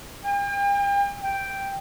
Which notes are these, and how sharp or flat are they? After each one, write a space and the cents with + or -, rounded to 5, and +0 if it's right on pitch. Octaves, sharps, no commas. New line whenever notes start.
G5 +40
G5 +0